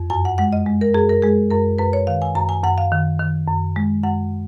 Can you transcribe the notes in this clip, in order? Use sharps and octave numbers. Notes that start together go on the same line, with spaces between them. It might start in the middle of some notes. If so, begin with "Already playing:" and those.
Already playing: F2
F#2 G#5
F#5
G#3 F#5
D#5
G#3
A#4
F#2 G#4
A#4
G#3 G#4
F#2 A#4
F#2 B4
C#5
D#3 F5
G#5
F#2 A#5
G#5
F#2 F#5
F5
D#3
D#3
F#2
G#3
F#2 F#5